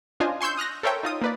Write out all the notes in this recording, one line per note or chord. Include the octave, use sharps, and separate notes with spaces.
C#4 D4 F4 C5 D#5 G#5
G#5 C6 C#6 E6 G6
D#6 F6 F#6 A#6
A4 A#4 C5 C#5 E5 G5
D#4 F4 D#6
A#3 B4 D5